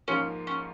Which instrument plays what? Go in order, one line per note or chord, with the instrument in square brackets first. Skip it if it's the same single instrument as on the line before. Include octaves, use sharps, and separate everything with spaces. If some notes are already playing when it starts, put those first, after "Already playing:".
[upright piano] G#2 F3 A#3 F4 [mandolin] C#4
[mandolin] C#4